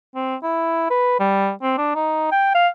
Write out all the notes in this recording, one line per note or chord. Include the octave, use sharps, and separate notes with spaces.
C4
E4
B4
G3
C4
D4
D#4
G5
F5